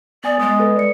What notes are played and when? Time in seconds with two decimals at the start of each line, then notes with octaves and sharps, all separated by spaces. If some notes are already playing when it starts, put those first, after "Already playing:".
0.24 B3 D5 G#5 D#6
0.40 G#3 D#6 A6
0.59 A4 B4
0.76 D5 C#7